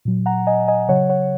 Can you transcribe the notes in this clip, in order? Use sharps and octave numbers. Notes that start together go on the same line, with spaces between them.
A#2 F#3
F#5 A#5
D#5 G#5
D#5 G#5
C#3 F#3 C#5 F#5
C#5 F#5